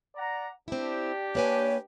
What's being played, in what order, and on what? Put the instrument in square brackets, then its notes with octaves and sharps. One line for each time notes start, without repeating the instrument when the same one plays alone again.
[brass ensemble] D5 F#5 A#5
[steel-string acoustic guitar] C4 E4 [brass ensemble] D4 G4
[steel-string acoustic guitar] A#3 B4 G#5 [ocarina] C#5